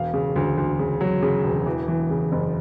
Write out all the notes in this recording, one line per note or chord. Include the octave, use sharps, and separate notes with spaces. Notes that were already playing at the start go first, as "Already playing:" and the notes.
Already playing: E1 F5
C#3
D2
D2
C#3
F#3
C#3
E1
E3
E3
C#3
F#1